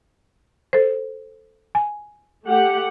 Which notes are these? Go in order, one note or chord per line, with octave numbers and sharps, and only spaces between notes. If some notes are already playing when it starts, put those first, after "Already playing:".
A4 C5
G#5
A3 G4 F#5